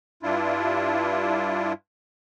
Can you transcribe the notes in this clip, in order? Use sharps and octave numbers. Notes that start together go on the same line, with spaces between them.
G2 D4 E4 F4